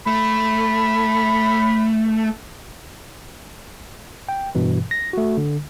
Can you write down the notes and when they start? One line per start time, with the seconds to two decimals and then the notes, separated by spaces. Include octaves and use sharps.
0.07 A3 B5
4.29 G5
4.55 G2 B2 E3
4.91 A#6
5.13 A3 F#4
5.37 D3